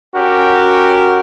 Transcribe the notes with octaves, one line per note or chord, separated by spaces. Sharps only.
C#4 F#4 G4 A#4